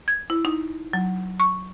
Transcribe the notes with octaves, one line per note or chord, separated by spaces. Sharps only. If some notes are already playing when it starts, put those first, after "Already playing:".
G#6
E4
D#4
F#3
C#6